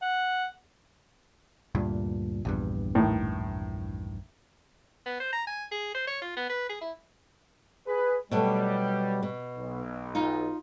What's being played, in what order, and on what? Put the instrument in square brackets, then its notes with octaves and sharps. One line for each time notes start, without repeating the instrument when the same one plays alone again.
[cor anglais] F#5
[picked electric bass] D2 G2 A#2
A#1 E2 G2
[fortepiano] A2 D#3
[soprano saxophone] B3
C5
A#5
G#5
G#4
C5
C#5
F4
B3
B4
G#4
E4
[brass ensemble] G#4 B4
[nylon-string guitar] B2 F#3 A3 [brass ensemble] G3
[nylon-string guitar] B2
[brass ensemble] B1
[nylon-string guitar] D#4 F4